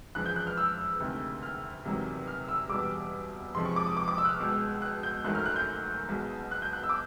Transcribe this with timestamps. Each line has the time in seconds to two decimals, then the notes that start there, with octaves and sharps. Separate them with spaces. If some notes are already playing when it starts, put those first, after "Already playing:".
0.15 E2 C#3 F3 F#6
0.26 G6
0.36 F#6
0.47 F6
0.57 E6
1.00 D2 C3 D#3 G#3
1.43 F6
1.85 E2 C3 D#3 F#3
2.28 F6
2.49 E6
2.69 E2 B2 G3 D6
3.54 F2 C3 F3 G#3 C6
3.65 C#6
3.76 D6
3.87 D#6
3.97 D6
4.08 D6
4.18 E6
4.25 F#6
4.29 F6
4.39 C#2 B2 G#3
4.82 F#6
5.03 G6
5.24 F#1 F#2 D#3 F#3 A3 F#6
5.35 F6
5.46 F#6
5.56 G6
6.09 B1 B2 G#3
6.51 F#6
6.62 G6
6.73 F#6
6.84 E6
6.89 D6